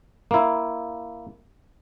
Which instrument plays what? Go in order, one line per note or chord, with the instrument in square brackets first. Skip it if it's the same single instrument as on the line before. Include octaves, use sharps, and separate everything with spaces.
[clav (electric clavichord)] A#3 E4